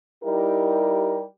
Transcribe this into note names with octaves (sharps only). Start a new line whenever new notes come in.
G3 D#4 E4 G4 A#4